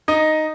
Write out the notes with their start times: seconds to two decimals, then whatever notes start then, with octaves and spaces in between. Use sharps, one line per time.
0.08 D#4 D#5